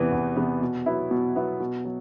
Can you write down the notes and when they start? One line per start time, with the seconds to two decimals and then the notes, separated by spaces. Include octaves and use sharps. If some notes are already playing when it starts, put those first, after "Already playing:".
Already playing: E2 C3 E3 B3
0.12 E2
0.36 C3 E3 B3
0.61 B2
0.86 F#3 B3 E4
1.11 B2
1.35 F#3 B3 E4
1.60 B2
1.85 F#3